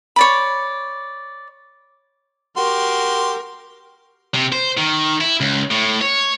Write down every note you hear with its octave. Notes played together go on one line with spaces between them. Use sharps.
C#5 D5 B5
F#4 G4 A#4 C6
C3
C5
D#3
E4
C#2
A2
C#5